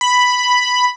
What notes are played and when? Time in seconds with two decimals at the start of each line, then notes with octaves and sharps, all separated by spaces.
0.01 B5